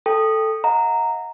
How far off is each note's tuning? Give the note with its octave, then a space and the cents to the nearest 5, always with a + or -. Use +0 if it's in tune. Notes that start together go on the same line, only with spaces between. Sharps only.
A4 +0 G5 +15
D#5 +30 F#5 -40 A#5 -10